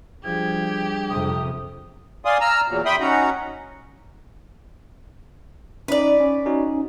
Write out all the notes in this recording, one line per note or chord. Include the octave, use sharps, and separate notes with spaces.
F3 G3 D4 G4 G#4 G#6
F2 C3 D#6
D5 F5 G#5 C6 D#6
A#5 E6 F6
E2 A#2 F#3
E5 G5 B5 C6 D#6
C#4 D#4 F#4 F#5 A#5
C#4 D#4 B4 D5
C#4
C#4 D#4 F#4